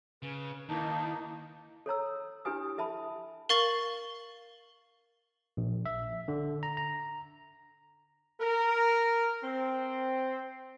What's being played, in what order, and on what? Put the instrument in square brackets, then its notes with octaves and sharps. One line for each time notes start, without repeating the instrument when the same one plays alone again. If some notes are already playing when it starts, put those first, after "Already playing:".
[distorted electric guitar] C#3 [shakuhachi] B4
[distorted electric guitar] D#2 [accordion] A#3 D#4 [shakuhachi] E4 [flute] A5
[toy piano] A4 C#5 A#5 E6
D4 E4 G4 B4 G#5 D#6
A4 E5 A5 B5
[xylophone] A#4 F5 C#6 A6 F#7
[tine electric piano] A#1
E5
D3
A#5
A#5
[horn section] A#4
C4